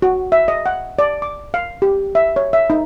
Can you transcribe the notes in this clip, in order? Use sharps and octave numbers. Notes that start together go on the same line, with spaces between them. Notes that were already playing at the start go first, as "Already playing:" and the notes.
F#4
E5
D#5
F#5
D5
D6
F5
G4
E5
C#5
E5
D#4